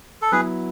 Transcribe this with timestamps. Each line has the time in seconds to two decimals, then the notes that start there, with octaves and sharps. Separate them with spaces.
0.22 A4
0.32 F#3 B3 E4 G#4 B4